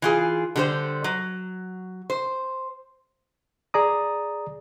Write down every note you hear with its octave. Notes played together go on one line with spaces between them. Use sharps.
E3 F4 G#4
D3 G3 C5
F#3
C5
G#4 D5 A#5 D#6